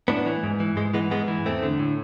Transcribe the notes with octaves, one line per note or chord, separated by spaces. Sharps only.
A2 B3 D4
E3
G#2
E3
G#2 G#3
E3 G#3 B3
G#2 G#3 B3
E3
E2 A3 C4
D3
A2